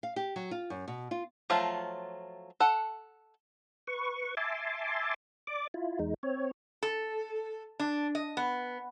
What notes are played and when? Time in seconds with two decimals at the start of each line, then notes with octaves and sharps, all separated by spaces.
0.03 F5
0.16 G4
0.36 F#3
0.51 F4
0.70 F#2
0.88 B2
1.11 F4
1.50 F3 F#3 A3 F4
2.60 A4 F#5
3.87 B4 C#6
4.37 E5 G#5 A5 C6 D6
5.47 D5 D6
5.74 E4 F4
5.99 E2 G#3 D#4
6.23 C4 C#5
6.83 A4
7.80 D4
8.15 D#5
8.37 B3